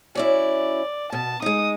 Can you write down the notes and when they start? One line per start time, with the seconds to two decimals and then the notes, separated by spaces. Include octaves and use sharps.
0.15 F#3 C#4 E4 D5
1.12 B2 A5
1.42 G#3 D#4 D#6